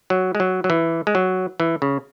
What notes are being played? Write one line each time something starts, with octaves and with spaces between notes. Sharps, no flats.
F#3
G#3
F#3
F#3
E3
G#3
F#3
E3
C#3